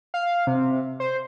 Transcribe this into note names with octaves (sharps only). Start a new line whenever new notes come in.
F5
C3
C5